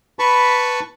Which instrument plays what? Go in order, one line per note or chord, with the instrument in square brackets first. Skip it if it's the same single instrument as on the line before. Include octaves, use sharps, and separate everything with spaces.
[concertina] B4 A5 B5 C#6